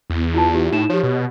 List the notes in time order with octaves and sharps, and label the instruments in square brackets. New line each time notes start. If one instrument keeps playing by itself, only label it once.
[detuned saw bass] E2
[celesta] E4 F4 A5
E4 F4 G4
[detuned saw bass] A2 [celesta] D#4 E7
[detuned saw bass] F3 [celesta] G4 C#5
[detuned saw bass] B2